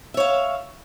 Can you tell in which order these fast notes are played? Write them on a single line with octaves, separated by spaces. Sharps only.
E5 C#5 F5